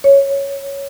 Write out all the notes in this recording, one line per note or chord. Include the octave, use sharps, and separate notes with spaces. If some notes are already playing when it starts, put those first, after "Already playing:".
C#5